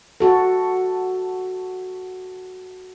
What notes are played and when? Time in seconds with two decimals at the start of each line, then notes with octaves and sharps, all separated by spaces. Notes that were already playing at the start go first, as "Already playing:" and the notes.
0.20 F#4 A4